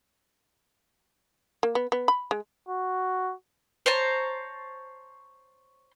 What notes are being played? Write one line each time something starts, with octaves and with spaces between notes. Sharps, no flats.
A#3
B3
B3
B5
G#3
F#4
C5 C#5 A5 A#5